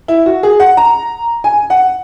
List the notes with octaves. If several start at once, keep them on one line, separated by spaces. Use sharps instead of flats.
E4
F#4
G#4
F#5
A#5
G#5
F#5